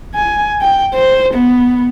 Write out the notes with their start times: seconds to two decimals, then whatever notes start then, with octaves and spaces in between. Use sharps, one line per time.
0.16 G#5
0.61 G5
0.94 C5
1.34 B3